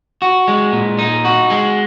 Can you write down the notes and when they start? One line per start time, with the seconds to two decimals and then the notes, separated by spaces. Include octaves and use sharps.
0.22 F#4
0.48 G#3
0.73 A#2
0.99 D#4
1.25 F#4
1.50 G#3